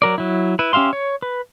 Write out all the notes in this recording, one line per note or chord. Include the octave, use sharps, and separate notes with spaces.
F#3 A#4 D5
F#3 E4
E4 B4
C#4 G4 E5 F5 C6
C#5
B4